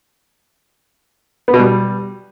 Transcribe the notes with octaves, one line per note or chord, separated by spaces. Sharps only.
B3
B2
G3